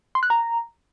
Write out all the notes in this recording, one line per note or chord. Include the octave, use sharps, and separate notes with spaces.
C6
F#6
A#5